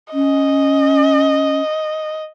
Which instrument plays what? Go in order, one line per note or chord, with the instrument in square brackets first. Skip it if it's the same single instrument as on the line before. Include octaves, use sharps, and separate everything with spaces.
[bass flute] C#4 [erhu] D#5